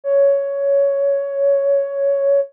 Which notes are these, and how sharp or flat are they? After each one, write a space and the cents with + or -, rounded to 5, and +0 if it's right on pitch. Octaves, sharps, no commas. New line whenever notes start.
C#5 +10